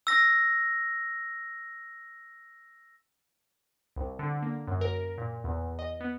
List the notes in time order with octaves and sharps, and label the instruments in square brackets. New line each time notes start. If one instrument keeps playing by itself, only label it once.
[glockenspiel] E6 A#6
[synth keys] C2
D3
A#3
F#2
A#4
A#2
E2
D#5
B3